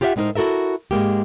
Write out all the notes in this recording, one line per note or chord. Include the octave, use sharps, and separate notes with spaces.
F4 G4 B4 D5 E5 F#5
A2 G#3 B3 D#4 A#4 C5
E4 F#4 A4 A#4 E5
G#2 G#3 A#3 G4